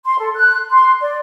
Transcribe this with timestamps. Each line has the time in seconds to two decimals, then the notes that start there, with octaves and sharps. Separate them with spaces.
0.06 C6
0.19 A4
0.35 F#6
0.71 C6
1.01 D5